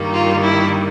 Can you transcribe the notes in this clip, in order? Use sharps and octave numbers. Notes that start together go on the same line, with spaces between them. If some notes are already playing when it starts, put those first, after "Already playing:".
Already playing: G2 D#3 G3 A#3
F4
E4